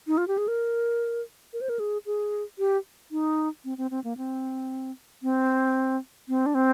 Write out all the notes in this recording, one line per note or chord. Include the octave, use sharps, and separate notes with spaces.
D#4
F4
G4
G#4
A#4
A#4
C5
A#4
G#4
G#4
G4
D#4
C4
C4
C4
A#3
C4
C4
C4
D4
C4